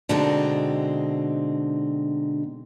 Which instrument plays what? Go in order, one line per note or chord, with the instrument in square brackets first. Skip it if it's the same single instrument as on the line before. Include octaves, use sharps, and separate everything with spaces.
[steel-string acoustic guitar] B2 D3 G#3 C4 D4 D#4